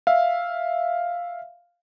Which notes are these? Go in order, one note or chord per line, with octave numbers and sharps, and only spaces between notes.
E5 F5